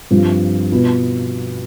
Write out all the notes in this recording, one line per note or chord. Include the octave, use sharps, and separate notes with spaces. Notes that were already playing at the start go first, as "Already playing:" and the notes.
G2 F3 C4 F4
B2 B3 F4 B4